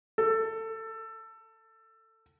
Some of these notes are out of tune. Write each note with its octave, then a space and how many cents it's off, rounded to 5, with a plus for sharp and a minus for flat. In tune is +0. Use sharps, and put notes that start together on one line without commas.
A4 +20